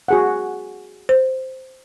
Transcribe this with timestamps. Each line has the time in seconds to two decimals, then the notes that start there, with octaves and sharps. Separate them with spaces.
0.08 F#4 G#4 F#5
1.09 C5